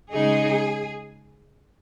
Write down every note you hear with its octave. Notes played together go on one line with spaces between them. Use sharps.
C#3 G#3 D#4 G#4